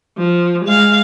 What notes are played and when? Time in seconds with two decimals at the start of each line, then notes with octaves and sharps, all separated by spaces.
0.18 F3
0.65 G#3 F5